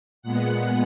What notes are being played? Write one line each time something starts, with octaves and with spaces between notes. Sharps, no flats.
A#2 G#3 B3 F#5